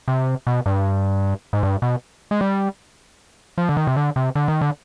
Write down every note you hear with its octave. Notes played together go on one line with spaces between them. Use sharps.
C3
B2
G2
G#2
G2
B2
G#3
G3
F3
D3
D#3
C3
D3
C3
D3
D#3
D3